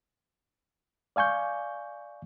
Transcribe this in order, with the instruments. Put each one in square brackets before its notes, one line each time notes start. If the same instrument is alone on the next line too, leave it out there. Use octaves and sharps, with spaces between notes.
[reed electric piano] D5 F5 G#5 C#6 G6